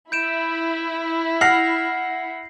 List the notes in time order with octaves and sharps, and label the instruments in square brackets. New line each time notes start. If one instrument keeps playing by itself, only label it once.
[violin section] E4 [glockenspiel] G6 D7 E7
[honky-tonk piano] F#5 F6 A#6 [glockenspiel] C7